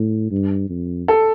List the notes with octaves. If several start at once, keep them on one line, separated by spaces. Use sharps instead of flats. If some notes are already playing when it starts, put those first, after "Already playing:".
Already playing: A2
G2
F2
A4